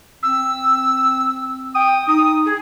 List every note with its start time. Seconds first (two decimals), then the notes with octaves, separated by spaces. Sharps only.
0.23 C4 E6
1.75 G5 D#6
2.08 D#4 D#6
2.46 G#4